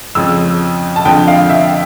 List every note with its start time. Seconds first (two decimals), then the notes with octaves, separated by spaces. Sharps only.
0.15 F2 C#3 F3 E6
0.96 A5
1.05 F2 D3 F3 G5
1.28 F5
1.50 E5